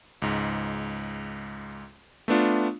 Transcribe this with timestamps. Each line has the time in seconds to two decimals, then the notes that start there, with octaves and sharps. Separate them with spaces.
0.22 C#2 G#2
2.28 A3 B3 D4 F4